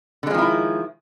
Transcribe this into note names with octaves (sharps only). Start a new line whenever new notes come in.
D3 D#3 F3 G#3 E4